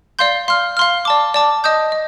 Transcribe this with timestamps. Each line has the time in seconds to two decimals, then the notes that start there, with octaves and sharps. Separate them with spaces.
0.19 D5 F5 C6 G6
0.48 F5 C6 F6
0.77 F5 C6 F6
1.05 D5 A5 D6
1.34 D5 A5 D6
1.64 D#5 A5 D#6 G6
1.92 D#5